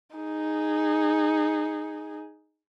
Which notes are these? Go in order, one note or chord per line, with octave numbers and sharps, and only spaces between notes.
D#4 G#4